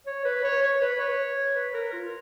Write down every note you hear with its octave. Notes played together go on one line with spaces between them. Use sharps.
C#5
B4
C#5
C#5
B4
C#5
B4
A#4
F4